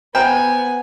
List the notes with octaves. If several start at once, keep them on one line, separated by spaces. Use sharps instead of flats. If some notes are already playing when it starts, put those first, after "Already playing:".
B3 C5 G5 G#5 A#5 B5